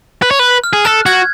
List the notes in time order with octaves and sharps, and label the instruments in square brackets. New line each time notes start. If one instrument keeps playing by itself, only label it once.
[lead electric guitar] B4
C#5
B4
[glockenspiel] F6
[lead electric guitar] G#4
[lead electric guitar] A4 [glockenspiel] F#6
[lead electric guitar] F#4 [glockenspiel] G#6